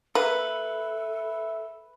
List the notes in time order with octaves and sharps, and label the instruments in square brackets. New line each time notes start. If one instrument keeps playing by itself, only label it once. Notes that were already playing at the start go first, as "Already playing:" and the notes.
[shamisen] A#3 [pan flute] A4 [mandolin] B4 [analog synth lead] E5